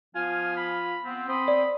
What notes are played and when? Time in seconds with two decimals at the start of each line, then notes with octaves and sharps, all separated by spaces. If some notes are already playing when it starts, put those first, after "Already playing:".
0.15 F3 B3 F4 F5 G#5
0.57 B5
1.06 B3 C4
1.29 C4 B5 C6 D#6
1.48 D5